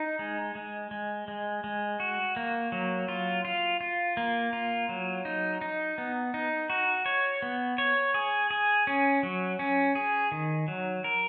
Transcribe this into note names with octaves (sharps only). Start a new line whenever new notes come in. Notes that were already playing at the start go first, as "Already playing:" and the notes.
Already playing: D#4
G#3
G#3
G#3
G#3
G#3
F#4
A#3
F#3
F4
F4
F4
A#3
F4
F#3
D#4
D#4
B3
D#4
F#4
C#5
B3
C#5
G#4
G#4
C#4
F#3
C#4
G#4
D#3
F#3
A#4